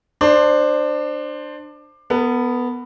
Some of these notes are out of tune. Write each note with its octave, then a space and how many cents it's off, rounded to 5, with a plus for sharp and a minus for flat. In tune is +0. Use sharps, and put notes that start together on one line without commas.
D4 +20 C5 +5
B3 +0 A#4 -45